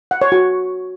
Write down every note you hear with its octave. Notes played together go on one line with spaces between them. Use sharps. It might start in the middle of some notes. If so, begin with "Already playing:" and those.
F#5
C#5
F#4